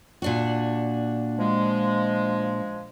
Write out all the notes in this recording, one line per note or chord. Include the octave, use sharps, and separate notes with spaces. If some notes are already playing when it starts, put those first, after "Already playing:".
A#2 D4 F#4
F3 G#3